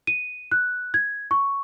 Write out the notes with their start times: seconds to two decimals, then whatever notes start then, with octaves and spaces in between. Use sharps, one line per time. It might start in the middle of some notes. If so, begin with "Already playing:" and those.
0.07 D#7
0.52 F#6
0.94 G#6
1.31 C#6